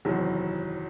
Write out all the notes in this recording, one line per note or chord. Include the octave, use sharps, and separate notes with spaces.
F#1 E2 C3 D#3 F#3